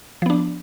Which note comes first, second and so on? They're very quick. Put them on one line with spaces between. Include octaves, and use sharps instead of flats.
F3 B3 D4